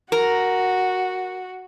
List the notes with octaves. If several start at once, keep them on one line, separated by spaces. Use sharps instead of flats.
F#4 A#4